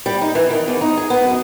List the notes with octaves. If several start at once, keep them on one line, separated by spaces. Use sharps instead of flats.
G3
D#4
E3
D#3
E2
D#4
G#4
B3
F#2